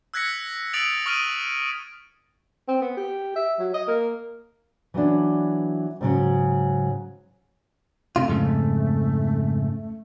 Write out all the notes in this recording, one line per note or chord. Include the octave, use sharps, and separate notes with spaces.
E6 F#6 G#6 A#6 B6 C#7
D#6 E6 A6 D7 F7 F#7
C#6 D#6 F6 D7 D#7
C4
B3
G4
E5
F#3
D#5
A#3
E3 F#3 B3 D4
G#2 C#3 F#3
C3 A3 F4
F2 G#2 C#3